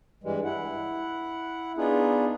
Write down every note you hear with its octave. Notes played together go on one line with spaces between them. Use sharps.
G2 E3 G3 G#3
E4 F#5
B3 D4 D#4 F4 G#4